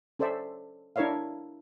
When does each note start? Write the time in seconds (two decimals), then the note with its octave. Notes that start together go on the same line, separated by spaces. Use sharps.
0.19 C#4 A4 C5 D5 E5
0.96 D4 E4 A#4 C#5 E5 F5